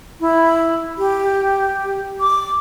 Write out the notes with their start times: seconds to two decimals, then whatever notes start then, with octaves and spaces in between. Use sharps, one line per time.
0.20 E4
0.98 G4
2.21 D6